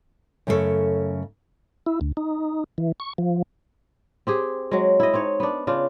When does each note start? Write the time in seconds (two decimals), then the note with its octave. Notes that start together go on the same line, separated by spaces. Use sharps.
0.47 F#2 C#3 A3 F4 A4 C#5
1.86 E4
2.01 D2
2.17 D#4
2.78 E3
3.00 C#6
3.18 F3
4.27 C4 G4 G#4
4.71 F#3 G#3
5.00 E4 D#5
5.14 C4 D#4 C#5
5.40 B3 D4
5.67 C#3 D4 F4